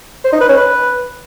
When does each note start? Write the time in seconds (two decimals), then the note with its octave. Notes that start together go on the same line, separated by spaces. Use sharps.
0.25 C5
0.33 D#4
0.41 B4
0.49 C#4
0.57 B4